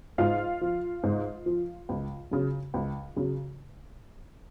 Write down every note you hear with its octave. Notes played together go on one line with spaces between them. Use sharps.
G#2 F4 F5
F3
G#2
F3
C#2
C#3 F#3
C#2
C#3 F#3